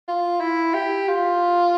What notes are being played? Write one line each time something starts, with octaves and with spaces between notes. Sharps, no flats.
F4
E4
G4
F4